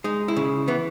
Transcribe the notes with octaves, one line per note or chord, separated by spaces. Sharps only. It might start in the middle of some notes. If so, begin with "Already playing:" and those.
G#3 D#4
E4
C#3
E3 B3